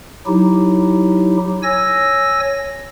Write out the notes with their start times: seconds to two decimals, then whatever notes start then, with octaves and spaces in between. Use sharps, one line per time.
0.27 F#3 D#4 E4 G4
1.63 C#5 G#5 E6 A#6